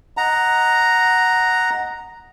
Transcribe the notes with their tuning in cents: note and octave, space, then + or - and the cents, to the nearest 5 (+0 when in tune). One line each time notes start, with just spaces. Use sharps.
D#5 +0 F#5 +0 A#5 +0